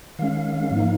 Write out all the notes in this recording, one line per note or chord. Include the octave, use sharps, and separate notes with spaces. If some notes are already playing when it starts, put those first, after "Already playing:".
D#3 G#3 C#4 F5
G#2 F3 A#3 D#4